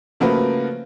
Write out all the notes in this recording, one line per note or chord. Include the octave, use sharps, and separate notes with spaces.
C#3 F3 A3 A#3 F#4 B4